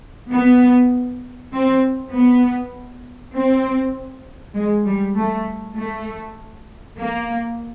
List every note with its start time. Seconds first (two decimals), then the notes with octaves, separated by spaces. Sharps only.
0.31 B3
1.52 C4
2.12 B3
3.33 C4
4.55 G#3
4.85 G3
5.15 A3
5.76 A3
6.97 A#3